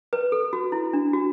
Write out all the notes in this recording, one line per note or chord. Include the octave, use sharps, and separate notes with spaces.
B4
A4
F#4
E4
D4
F#4